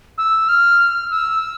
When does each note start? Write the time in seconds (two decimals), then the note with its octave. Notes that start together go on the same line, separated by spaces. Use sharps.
0.18 E6
0.49 F6
1.11 E6